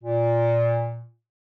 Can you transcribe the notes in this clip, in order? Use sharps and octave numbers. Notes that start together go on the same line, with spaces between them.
A#2